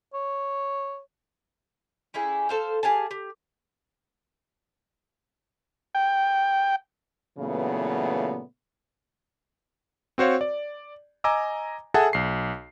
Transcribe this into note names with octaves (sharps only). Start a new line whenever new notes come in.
C#5
C#4 E4 G4 G#4
A4 C5 F5
G4 G#4 F5 A5
G4
G5
A#2 C#3 E3 F#3 A3 B3
C4 F#4 C5 C#5 F5
D5
D#5 G#5 A#5 D6 E6
G#4 A4 E5 F#5 G#5 A5
B1 C7